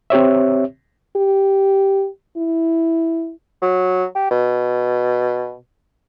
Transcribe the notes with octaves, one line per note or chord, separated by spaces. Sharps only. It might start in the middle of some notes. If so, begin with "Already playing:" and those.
C4 G4 C#5 E5
G4
E4
F#3
G4
B2